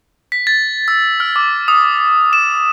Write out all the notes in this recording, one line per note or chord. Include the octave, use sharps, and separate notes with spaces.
B6
A6
E6
F6
D6
D#6
E7